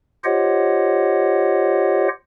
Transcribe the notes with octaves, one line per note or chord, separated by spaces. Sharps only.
F4 G4 C5 C#5 D#5 F#5